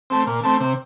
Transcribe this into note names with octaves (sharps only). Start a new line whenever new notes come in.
A3 C4
A#2
A3 C4
C3